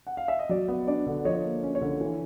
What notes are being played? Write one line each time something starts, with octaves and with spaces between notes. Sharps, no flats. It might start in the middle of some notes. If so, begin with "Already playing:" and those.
F#5
F5
E5
D#5
F#3 D5
B3
D4 D5
D3
F3 C#5 D#5
A#3
C#4
C#5
D3
E3